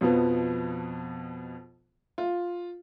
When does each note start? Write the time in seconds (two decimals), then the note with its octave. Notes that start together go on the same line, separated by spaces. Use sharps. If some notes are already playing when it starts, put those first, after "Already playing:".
0.01 F2 B2 F3 B3
2.18 F4